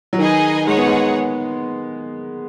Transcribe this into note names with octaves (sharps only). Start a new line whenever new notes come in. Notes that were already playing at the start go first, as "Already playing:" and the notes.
F#3
D#3 D#4 G#4 B4 D#5 G#5
G#3 D#4 G#4 C#5 F#5
B3
G#3